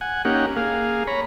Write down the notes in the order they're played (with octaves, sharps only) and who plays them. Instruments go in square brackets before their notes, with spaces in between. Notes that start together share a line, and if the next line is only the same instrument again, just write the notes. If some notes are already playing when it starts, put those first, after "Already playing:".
[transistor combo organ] F#5 G#5
A#3 C#4 D#4 G4 F#5
A#3 G#4 F5
C#5 A#5 B5